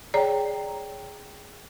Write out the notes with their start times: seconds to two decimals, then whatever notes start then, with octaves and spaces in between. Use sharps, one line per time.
0.14 G#4 C#5 D5 G5 A#5